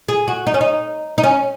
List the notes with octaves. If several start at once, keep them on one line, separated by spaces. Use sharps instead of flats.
G#4
F#4
D#4
C#4
D#4
D#4
C#4